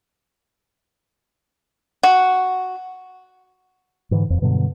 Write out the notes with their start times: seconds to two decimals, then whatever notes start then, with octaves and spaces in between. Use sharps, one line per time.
2.03 F#4
4.11 G#2 D3 E3
4.30 E1 F2
4.42 G2 B2 D3 F#3